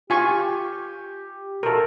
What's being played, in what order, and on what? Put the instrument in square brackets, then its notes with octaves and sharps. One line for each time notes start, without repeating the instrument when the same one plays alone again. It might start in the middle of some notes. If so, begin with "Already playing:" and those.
[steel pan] F4 G#5 C#6 [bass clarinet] G4
[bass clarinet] B2 [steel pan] A4 A#4